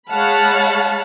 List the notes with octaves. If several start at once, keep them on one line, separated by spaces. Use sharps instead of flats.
G#3 C#5 F5 F#5 A5 B5